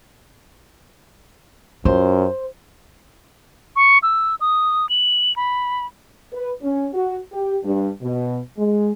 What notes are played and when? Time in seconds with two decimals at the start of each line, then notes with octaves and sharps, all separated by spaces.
1.85 F#2 F4 C5
3.76 C#6
4.03 E6
4.41 D#6
4.89 F#7
5.36 B5
6.33 B4
6.62 C#4
6.94 F#4
7.33 G4
7.64 G2
8.02 B2
8.58 G#3